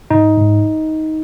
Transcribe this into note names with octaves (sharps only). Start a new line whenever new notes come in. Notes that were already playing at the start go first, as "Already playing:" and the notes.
G#2 D#4
G#2